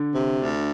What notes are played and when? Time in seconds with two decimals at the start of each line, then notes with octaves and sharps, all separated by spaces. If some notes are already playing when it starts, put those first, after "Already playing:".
Already playing: D3
0.14 C3
0.41 D2